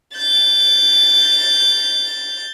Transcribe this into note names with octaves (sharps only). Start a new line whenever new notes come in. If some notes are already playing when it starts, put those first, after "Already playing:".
G6 A6